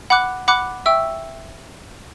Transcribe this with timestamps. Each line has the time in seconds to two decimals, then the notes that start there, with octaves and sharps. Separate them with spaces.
0.10 F#5 B5 D6 F#6
0.48 F#5 B5 D6 F#6
0.86 E5 G5 C#6 E6